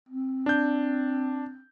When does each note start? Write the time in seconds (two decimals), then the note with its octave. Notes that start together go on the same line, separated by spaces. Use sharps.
0.09 C4
0.46 D4 G6